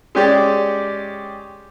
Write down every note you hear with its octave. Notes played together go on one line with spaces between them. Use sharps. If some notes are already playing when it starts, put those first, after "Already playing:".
G#3 C#4 G4 D5